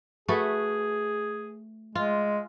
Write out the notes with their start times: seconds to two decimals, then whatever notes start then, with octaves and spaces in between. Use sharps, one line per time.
0.28 A3 F#4 G#4 B4
1.95 G#3 F4